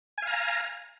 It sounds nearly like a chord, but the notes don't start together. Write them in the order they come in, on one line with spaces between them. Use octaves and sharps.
G#5 F5 A#5